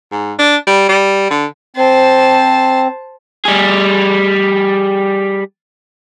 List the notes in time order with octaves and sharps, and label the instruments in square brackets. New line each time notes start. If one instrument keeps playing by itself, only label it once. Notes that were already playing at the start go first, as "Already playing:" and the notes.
[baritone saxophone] G#2
D4
G3
G3
D3
[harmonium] C4 [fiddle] C5 A5
[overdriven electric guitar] G3 G#4